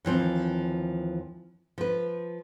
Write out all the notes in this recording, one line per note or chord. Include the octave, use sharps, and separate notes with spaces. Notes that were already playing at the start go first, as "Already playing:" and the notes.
D#2 E3 F3 C4
F3 B4